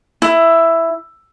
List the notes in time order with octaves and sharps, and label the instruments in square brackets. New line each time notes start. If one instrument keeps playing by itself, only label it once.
[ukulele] E4